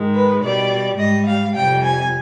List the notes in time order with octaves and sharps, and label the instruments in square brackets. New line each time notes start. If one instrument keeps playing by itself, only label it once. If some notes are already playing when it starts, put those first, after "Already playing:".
Already playing: [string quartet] G#2 D#3 G#3
B4
B2 G3 D5
G#2 G3 D#5
F5
F2 C3 G3 G5
G#5